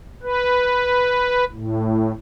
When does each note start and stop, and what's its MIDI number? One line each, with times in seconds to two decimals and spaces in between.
0.23 1.44 71
1.53 2.12 45